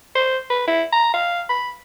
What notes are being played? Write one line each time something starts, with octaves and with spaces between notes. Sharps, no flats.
C5
B4
E4
A#5
F5
B5